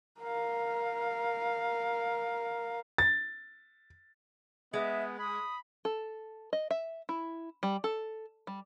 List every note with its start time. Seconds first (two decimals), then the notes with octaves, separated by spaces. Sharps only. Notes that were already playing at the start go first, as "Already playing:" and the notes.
0.20 A#4 F5
2.98 A6
4.73 G#3 B3 E5
5.19 B5 D#6
5.85 A4
6.53 D#5
6.71 E5
7.09 E4
7.63 G3
7.84 A4
8.47 G3